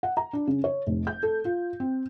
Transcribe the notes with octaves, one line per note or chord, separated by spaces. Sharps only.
F#5
A#5
D4
C#3
C#5
F1
G6
A4
F4
C4